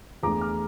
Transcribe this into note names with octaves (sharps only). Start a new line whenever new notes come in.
E2 E3 A3 D4 A#5 D6
D6 F6